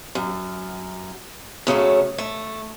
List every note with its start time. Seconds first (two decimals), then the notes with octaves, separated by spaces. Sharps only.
0.15 F#2
1.67 F#2 C#3 F#3 A3
2.18 A3